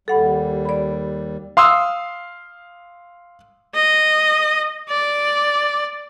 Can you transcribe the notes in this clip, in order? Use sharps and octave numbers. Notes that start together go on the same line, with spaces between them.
D#2 G3 A4 F#5 B5
D5 B5
F5 C6 D#6 E6
D#5
D5